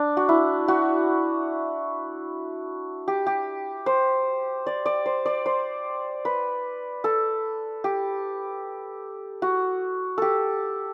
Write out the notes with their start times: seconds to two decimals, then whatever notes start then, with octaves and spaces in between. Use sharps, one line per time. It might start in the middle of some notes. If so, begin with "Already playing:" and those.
Already playing: D4
0.17 F#4
0.29 E4
0.68 F#4
3.08 G4
3.27 G4
3.86 C5
4.67 D5
4.86 D5
5.06 C5
5.26 D5
5.46 C5
6.25 B4
7.04 A4
7.84 G4
9.42 F#4
10.18 G4 A4